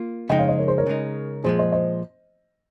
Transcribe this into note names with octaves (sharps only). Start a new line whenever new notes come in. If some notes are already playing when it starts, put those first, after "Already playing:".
Already playing: A#3 F4
C#3 F3 G#3 D#4 D#5 G5
C#5 F5
C5 D#5
A#4 C#5
G#4 C5
A#4 C#5
C#3 G#3 D#4
A#2 F3 G#3 G#4 C5
C5 D#5
C5 D#5